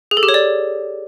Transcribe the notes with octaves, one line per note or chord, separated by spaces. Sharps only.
G#4
A4
G4
C#5
D5